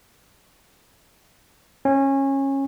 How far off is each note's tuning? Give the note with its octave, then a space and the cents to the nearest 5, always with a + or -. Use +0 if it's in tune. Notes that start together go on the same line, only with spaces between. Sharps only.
C#4 -20